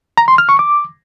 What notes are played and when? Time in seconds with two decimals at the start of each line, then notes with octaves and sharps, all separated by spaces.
0.17 A#5
0.28 C6
0.38 F6
0.49 C#6
0.59 D6